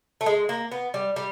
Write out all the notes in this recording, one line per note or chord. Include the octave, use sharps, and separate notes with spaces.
A3
G#3
A#3
B3
G3
G3